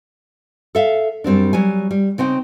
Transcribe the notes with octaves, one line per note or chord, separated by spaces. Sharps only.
A4 E5 F5
F#2 G3 C4 D4
F#3 G3 G#5
G3
C#3 C4 D#4 G5